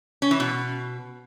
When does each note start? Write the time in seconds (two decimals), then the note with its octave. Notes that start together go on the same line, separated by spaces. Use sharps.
0.22 C#4
0.31 E3
0.40 B2